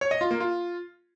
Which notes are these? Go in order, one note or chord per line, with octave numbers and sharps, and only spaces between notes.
C#5
D#5
F4
A#3
F4